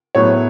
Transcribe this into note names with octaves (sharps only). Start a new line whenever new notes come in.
A2 F#3 B3 C#5